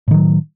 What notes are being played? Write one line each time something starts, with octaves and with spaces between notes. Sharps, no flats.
A2 D#3 F#3